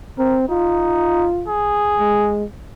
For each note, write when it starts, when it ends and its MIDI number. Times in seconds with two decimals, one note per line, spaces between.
0.18 0.45 60
0.18 0.37 70
0.49 1.27 63
0.49 1.50 65
1.47 2.34 68
1.99 2.44 56